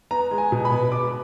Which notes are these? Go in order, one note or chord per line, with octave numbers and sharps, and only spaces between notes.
B3 A#5
G#3
G#5
B2
B5
B3
B3 D6